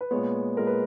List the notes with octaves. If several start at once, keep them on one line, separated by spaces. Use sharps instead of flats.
B4
A#2 G#3 B3 C#5
A#2 G#3 B3 A#4
B4